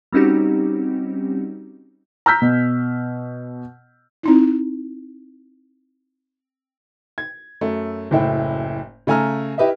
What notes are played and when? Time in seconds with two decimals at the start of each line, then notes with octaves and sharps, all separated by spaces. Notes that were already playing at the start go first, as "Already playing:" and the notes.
0.12 G3 C4 C#4 D#4 F#4 G4
2.26 A#5 E6 F6 G6 B6
2.42 B2
4.23 C4 D#4 E4
7.18 G#6
7.61 F#2 A3
8.11 F#1 A2 E4 G5
9.07 C#3 A3 G#5 A#5 F6
9.58 E4 G4 B4 D#5 E5